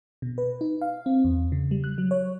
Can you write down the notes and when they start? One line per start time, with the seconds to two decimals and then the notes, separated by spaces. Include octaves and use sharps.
0.22 B2
0.38 B4
0.61 D#4
0.81 F5
1.06 C4
1.24 E2
1.52 C#3
1.71 G3
1.84 F#6
1.98 F#3
2.11 C#5